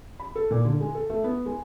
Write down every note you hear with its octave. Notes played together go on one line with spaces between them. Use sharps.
B5
A4
A#2
D3
G#3
A4
A3
B3
G#3